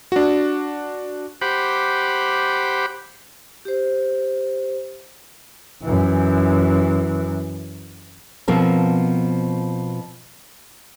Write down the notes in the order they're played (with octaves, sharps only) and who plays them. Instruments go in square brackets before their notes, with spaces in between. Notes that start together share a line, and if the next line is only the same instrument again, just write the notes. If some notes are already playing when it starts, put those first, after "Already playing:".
[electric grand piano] D4 F#4
[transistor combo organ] G4 C5 F#5 B5 D6
[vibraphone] G4 C5
[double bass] F#2 E3
[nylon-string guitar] B2 F3 C4 A#4